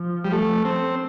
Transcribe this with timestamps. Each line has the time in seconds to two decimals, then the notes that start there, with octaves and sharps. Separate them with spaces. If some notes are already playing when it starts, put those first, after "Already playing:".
Already playing: F3
0.25 G3
0.33 A3
0.65 C4